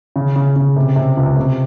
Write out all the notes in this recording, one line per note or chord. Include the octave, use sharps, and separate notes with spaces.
C#3
C#3
C#3
C3
C3
C#2
C3